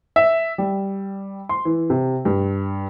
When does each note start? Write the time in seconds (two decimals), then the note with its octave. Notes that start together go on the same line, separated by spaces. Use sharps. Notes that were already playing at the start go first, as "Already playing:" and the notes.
0.16 E5
0.58 G3
1.49 C6
1.65 E3
1.90 C3
2.25 G2